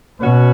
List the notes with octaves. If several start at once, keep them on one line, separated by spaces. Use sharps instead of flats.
B2 C#4 F#4 B4